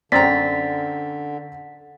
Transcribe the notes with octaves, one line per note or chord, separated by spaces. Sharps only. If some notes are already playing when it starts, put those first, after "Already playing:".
F#2 D3 C4 D5 A#5 A6 B6